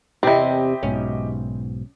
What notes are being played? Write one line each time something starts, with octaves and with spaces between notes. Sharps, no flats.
E2 C3 C4 E4 G4 D#5
B1 G#2 B2 C#4